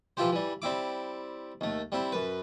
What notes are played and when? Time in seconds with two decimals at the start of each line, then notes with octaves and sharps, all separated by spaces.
0.17 E3 F3 E4 F4 G4 C5
0.32 E3 G3
0.62 G3 C4 E4 D6
1.61 D#2 A3
1.92 G3 C4 E4
2.12 F#2 B4